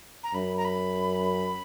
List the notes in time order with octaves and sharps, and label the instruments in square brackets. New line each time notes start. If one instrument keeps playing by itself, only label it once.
[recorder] A#5
[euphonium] F#2 [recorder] B5
[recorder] A#5
B5